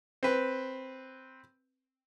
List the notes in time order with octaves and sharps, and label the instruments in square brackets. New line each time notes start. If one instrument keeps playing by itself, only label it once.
[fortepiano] C4 B4